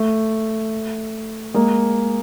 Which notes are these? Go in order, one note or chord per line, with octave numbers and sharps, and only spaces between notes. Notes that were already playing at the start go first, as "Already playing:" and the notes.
Already playing: A3
G#3 A#3